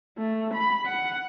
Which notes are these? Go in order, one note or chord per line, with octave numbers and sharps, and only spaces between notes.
A3
B5
F#5